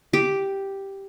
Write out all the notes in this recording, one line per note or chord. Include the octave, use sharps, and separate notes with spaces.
G4